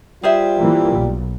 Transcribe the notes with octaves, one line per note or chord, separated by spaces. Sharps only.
G3 F4 G#4 C5 E5
E3 A#3
B1